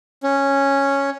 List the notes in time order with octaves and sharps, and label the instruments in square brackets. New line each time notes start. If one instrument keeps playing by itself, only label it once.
[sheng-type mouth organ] C#4